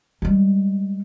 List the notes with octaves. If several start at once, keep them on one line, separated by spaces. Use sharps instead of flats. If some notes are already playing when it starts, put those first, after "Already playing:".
G3 G#3